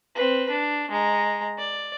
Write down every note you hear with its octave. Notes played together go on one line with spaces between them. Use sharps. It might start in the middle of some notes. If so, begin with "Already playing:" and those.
C4 B4
D4
G#3 A#5
D5